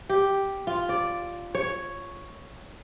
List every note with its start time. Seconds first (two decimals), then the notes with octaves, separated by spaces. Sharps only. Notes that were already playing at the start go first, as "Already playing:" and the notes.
0.09 G4
0.67 F4
0.89 D5
1.55 C#5